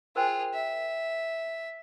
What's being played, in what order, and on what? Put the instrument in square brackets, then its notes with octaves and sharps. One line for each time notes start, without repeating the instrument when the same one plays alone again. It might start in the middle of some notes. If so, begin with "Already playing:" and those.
[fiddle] F4 G#4 [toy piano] A#4 C5 G5
[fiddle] E5